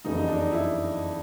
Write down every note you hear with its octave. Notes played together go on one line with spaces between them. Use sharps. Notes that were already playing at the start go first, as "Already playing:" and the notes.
F#1 F2 C#3 E3 G3 D#4
D#4
D4
D#4
E4